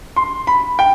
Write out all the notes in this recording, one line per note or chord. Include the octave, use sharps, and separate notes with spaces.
C6
B5
G5